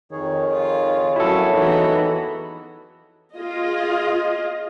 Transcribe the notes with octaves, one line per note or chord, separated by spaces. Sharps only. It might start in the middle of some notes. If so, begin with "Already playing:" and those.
F2 D#3 G#4 C#5
F4
F#3 A#3 C#4 E4 F#4 A4
E3 B3 D#4 F#4
F4 G#4 D#5